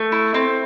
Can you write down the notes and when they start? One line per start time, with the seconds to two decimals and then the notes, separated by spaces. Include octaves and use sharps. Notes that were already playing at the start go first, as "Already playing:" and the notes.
Already playing: A3
0.12 E4
0.34 C4